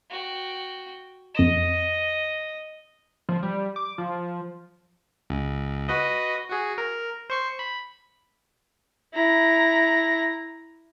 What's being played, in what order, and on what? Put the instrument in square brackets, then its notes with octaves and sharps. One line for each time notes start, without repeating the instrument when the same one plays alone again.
[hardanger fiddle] F#4 G5
[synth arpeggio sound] F2 E7 [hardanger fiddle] D#5
[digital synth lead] F3
G3
D6
F3
[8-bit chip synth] C#2
F#4 B4 D#5
F#4 G#4
A#4
C5 C#6 C7
B5
[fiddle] E4 A#5